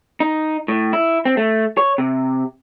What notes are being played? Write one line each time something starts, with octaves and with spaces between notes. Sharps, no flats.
D#4
A2
E4
C4
A3
C#5
C3